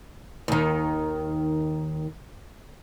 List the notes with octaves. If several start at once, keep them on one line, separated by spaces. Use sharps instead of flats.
D#2 D#3